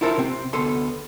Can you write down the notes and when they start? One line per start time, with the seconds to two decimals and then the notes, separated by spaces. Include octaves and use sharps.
0.01 E4 F4 A4 A#4 C5
0.18 C3 C4
0.53 D2 B3 A4 C6